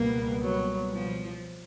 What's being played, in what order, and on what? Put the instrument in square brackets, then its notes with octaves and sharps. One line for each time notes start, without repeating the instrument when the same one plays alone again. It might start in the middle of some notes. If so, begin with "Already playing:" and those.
Already playing: [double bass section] C#2 B2 G3 B3 [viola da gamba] A#3
[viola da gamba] F#3
F3